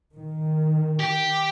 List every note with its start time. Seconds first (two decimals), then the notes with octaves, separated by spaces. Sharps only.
0.14 D#3
1.00 G4